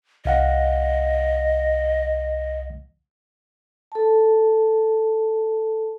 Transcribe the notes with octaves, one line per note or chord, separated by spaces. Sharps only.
C2 D#5 F5 F#5
A4 A5